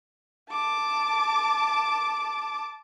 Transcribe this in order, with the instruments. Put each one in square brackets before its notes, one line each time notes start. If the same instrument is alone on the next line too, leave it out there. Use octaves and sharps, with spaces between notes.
[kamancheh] A5 D6